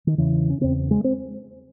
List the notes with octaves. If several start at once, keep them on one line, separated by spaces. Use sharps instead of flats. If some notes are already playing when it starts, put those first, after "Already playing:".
D#3
E2 C#3 E3
C#4
E2 C#3 C4
G#3
C4